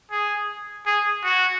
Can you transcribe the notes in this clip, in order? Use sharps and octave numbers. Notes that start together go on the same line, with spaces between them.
G#4
G#4
F#4